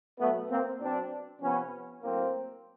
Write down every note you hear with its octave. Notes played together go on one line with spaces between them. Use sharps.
B2 F#3 A3 B3
A#3 C4
B2 F#3 C4 D4
C3 F3 B3 C#4
A2 F#3 A#3 C4